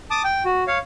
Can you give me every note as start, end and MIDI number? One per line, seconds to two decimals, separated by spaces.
0.11 0.22 81
0.11 0.22 86
0.11 0.22 87
0.24 0.43 79
0.45 0.63 66
0.67 0.78 73
0.67 0.78 77